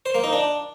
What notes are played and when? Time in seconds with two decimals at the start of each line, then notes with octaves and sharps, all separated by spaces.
0.06 C5
0.15 A#3
0.24 D#4
0.33 D4